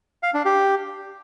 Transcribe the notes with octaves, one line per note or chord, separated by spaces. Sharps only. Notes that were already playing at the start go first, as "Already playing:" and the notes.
F5
D4
G4